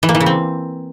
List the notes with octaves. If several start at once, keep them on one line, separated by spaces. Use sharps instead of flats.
E3
A#3
E3
C#3
C4